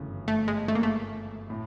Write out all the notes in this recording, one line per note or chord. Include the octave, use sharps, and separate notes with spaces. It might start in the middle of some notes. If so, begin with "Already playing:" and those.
Already playing: G1 F#2 C#3 E3 A3
A3
G#3
A3
A#3
A3
A2